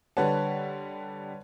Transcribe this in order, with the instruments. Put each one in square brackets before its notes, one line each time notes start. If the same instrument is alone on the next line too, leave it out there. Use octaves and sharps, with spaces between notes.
[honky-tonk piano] D3 G3 F#5 [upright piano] B4 C#5 A5